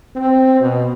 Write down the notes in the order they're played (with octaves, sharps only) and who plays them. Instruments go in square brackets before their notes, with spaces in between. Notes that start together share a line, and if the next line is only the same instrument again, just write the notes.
[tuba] C4
B2